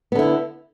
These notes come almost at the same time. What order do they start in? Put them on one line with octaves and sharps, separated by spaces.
B3 D3 E4